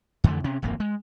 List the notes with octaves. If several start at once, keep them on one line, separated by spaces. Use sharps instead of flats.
F2 D3 E3 A3
C3 C#4
D1 G#1 F2 A#3
G#3